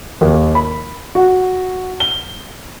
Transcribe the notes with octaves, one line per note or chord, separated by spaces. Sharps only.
D#2
B5
F#4
G7